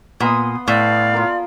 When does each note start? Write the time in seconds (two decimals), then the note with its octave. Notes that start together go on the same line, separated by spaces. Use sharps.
0.20 A#2 B3 C6 D#6
0.68 A2 D5 F5
1.14 A#3 F4